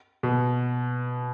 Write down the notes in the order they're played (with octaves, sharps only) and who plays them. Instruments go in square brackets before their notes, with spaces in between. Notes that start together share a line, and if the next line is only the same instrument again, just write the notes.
[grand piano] B2